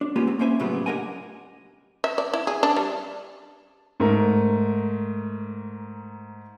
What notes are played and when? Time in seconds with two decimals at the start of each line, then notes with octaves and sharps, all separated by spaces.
0.01 D4
0.16 G#3 A#3 B3 C#4 F4 G4
0.27 C4
0.39 A#3 C#4 E4 C5 E5 G#5
0.60 A2 C#3 F#3 G3 B3 F4
0.86 D4 G4 A#4 D#5 F#5 G#5
2.04 E5
2.18 D5
2.33 E4
2.47 G#4
2.63 D4
2.76 G3
4.00 G#2 A3 A#4